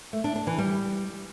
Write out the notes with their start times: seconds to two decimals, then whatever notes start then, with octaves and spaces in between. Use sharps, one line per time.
0.13 A3
0.24 D4
0.36 D4
0.47 E3
0.58 G3